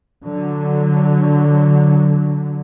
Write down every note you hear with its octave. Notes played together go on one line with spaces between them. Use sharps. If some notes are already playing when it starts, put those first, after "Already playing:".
D3 F#3